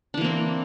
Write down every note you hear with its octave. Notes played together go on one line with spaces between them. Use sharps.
E3 A#3 C4 D4